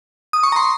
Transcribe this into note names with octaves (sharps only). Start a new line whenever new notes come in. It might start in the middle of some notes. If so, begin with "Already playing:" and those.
D#6
C#6
A#5
C6